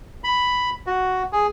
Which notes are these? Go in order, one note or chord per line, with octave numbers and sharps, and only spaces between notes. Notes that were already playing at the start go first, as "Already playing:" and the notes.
B5
F#4
G#4